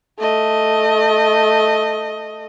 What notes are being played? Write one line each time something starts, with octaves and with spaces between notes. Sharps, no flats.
A3 D#5